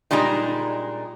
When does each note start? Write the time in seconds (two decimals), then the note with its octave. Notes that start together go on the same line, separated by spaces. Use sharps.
0.11 A#2 G3 G#3 D4 D#4